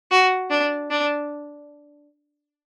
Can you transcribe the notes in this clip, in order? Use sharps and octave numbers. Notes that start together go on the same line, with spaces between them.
F#4
D4
D4